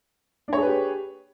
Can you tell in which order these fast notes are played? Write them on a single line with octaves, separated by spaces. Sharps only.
D4 C#5 G#4 B4 G4